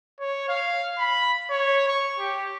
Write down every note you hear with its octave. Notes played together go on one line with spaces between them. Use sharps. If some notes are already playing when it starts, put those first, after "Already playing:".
C#5
F5
B5
C#5
C#6
G4